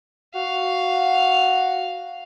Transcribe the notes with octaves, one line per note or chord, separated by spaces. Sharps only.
F#4 F5